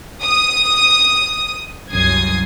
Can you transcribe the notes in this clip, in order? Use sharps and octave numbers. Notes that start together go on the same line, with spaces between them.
D#6
C2 F#2 D#6 G#6 C7